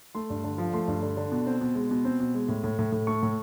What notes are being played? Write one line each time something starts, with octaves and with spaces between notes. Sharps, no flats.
A3 C6
G2
D3
F3
A3 C6
G2
D3
D3
B2
C4
B2
G#3
B2
C4
B2
G#3
A2
A2
A2
A2
A3 C#6
A2